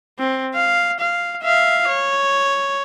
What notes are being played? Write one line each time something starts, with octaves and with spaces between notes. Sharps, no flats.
C4
F5
F5
E5 F5
C#5